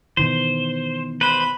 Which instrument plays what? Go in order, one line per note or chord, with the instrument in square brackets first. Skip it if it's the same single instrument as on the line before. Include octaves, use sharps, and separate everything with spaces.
[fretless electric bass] B2 D#3 E3 [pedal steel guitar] C5
[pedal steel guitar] B4 C5 [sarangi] B5